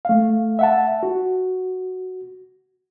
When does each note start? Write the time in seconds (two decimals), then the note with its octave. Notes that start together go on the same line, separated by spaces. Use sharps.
0.05 A3 F5
0.59 E5 F#5 A5
1.03 F#4